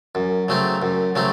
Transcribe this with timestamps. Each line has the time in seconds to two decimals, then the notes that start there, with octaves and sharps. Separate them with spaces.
0.15 F#2
0.48 C#3 F#3 A3 C4
0.82 F#2
1.15 C#3 F#3 A3 C4